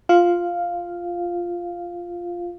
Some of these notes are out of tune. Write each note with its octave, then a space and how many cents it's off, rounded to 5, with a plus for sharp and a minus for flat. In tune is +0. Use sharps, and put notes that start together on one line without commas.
F4 +0 F5 +0